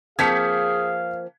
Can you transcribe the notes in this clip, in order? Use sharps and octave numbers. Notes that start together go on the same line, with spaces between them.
F3 A#3 C4 G#4 F5 G#6 B6 C#7